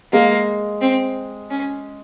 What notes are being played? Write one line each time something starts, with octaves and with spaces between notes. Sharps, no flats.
G#3 A#3
C4
C#4